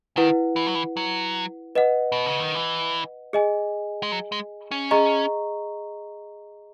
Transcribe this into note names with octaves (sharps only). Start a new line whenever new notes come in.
D#3 E4 B4 F#5
E3
F#3
E3
F#3
B4 D#5 F#5
B2
C#3
D#3
E3
G#4 D#5 G#5
G#3
F#3
G#3
C#4
G#4 D#5 A#5 C#6